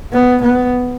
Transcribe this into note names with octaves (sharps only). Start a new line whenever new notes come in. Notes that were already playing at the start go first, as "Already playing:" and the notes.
B3
B3